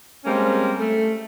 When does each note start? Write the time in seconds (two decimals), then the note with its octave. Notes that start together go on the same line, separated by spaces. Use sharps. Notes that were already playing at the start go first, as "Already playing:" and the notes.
0.25 G3 G#3 A#3 C4 C#4
0.79 A3